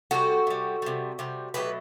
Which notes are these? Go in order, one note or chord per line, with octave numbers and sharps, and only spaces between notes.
C3 G3 F#4 A4
C3 G3
C3 G3
C3 G3
B2 F#3 A3 G4 B4